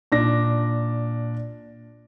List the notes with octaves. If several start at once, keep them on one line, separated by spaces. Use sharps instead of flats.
A#2 D4 A#6